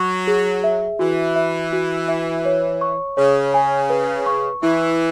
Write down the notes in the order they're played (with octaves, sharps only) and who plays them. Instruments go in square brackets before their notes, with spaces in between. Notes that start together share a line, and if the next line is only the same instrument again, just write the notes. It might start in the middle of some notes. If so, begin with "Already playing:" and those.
Already playing: [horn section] F#3 [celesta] C#6
[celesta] G#4
E5
[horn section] E3 [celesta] F#4
[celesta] E5
F#4
E5
C#5
C#6
[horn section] C#3 [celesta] C#5
[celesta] G#5
B4
C#6
[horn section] E3 [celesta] E4